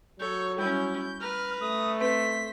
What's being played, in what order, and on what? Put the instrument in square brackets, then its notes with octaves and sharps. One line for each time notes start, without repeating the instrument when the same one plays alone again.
[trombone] F#3 [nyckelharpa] A4 C#5 [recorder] G6
[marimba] G3 [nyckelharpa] C#4 E4 [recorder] G6
[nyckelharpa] B4 A#5 [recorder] F6
[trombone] A3 [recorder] D#6
[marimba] C4 B4 [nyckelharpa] C5 [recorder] B6